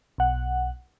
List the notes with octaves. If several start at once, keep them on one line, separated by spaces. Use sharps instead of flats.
B1 F#5